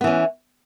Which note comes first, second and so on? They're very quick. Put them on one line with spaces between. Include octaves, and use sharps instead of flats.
B3 E3 C#4